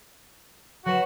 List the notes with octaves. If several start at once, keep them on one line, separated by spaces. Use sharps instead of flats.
F#3 F#4 B4 E7